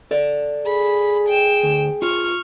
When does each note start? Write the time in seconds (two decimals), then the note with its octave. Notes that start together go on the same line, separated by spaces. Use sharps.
0.11 A4 D5
0.67 G#4 B5
1.28 G5 E7
1.63 D2
2.02 F4 C#6 F6